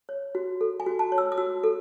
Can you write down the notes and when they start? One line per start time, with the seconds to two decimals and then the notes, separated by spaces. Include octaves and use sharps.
0.09 C#5
0.35 F#4
0.61 A4
0.80 G#5
0.86 F#4
0.99 A5
1.12 C#5
1.18 E6
1.32 D#6
1.37 F#4 E6
1.64 A4